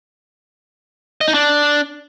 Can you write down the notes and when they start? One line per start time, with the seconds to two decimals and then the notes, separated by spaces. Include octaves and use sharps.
1.21 D#5
1.28 D#4
1.34 D4